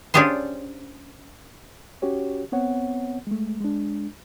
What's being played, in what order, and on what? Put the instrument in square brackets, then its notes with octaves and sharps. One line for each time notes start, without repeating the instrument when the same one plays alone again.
[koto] C#4 D4 F4 G4 G#4 C5
[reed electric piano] C#4 F#4 G4 C#5
B3 C4 C#5 F#5
G#3 A3
G#3 D4